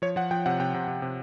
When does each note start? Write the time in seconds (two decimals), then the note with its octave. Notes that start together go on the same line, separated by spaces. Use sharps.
0.02 F3 C#5
0.16 F3 F#5
0.31 F3 G5
0.46 C3 F#5
0.60 C3 G5
0.74 C3
0.88 C3
1.02 C3